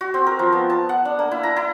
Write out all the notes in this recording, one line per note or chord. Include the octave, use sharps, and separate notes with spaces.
F#4
C4
A#4
F3
B3
A5
F#5
D4
A#3
E4
A#5
E4